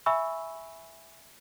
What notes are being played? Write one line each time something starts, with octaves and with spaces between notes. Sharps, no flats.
E5 G#5 B5 C#6 E6